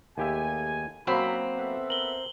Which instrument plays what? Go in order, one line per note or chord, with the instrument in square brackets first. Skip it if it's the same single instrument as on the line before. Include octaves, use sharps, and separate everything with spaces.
[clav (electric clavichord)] D#2 G4 E5 [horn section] A3 G#4 G#5
[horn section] F#2 B5 [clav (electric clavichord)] F#3 A#3 [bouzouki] C4
[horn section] B3 A4 E5
[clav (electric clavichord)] A#4 [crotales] F#7 G7